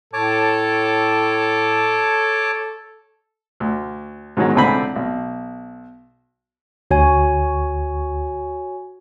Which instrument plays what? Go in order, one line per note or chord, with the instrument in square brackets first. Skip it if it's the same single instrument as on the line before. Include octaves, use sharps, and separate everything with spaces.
[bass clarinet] A2 [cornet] A4 [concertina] C#5 A5 D6
[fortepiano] D2
G#2 B2 D#3 F#3 G#3
C#2 A2 D3 C4 G#5 B5
B1
[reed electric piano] D2 [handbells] F#4 C#5 G#5